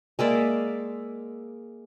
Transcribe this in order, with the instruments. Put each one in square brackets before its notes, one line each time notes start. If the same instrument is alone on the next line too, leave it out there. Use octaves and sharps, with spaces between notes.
[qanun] G#3 A#3 D5 E5